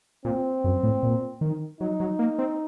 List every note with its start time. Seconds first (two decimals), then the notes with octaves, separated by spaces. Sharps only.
0.25 A#2 C4
0.64 F#2
0.83 A2
1.03 A#2
1.41 D#3
1.81 F#3 D#4
2.00 F#3
2.19 A#3
2.39 C4